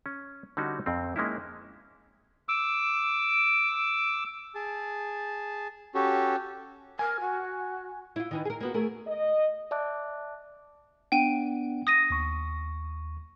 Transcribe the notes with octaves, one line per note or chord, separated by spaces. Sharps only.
C#4
D3 G3 C#4 D#4 F#4
F2 C4
G#3 A#3 C#4 D#4 E4
D6 E6
G#4 A5
C#4 F#4 G4 A4
A#4 G#5
F#4
E4 F4
D#3 E3 D#4
G#4 A#4
A#3 B3 F#4
A3 G#4 A#4
D#5
D5 E5 A5 D6 F#6
B3 D4 F#5 G5 D#7
D#6 A#6 D#7
D#2 C#6